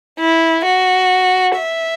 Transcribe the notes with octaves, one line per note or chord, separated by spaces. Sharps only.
E4
F#4
E5